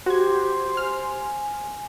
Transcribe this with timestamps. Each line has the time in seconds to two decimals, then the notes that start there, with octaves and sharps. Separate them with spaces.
0.06 F#4 G4 C5 G#6
0.77 G#5 F6